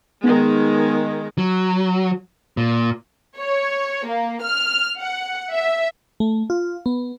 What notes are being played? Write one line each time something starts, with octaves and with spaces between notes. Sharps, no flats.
D#3 G#3 B3 D#4
F#3
A#2
C#5
A#3
F6
F#5
E5
A3
F4
B3